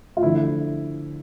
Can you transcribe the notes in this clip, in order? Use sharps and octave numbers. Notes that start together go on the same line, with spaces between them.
F4
D3 F3 A3 E4